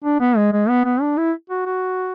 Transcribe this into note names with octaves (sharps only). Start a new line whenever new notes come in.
D4
B3
G#3
G#3
B3
B3
D4
E4
F#4
F#4